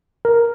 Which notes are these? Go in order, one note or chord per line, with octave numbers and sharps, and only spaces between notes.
A#4